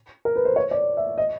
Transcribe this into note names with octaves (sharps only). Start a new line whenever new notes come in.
A#4
B4
C5
C#5
D5
E5
D#5